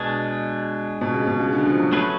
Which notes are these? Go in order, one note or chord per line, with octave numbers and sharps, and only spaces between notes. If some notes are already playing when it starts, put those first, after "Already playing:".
Already playing: B2 G#3 D4 G#4
B2
C#3
B2
C#3
D3
F3
F#3
F#3 A3 C#4 G#4 B4